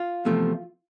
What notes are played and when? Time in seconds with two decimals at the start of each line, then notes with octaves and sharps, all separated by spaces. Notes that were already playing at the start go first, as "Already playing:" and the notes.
Already playing: F4
0.25 E2 C3 F3 A3